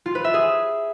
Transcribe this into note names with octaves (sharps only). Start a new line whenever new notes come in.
F4
B4
E5
G#4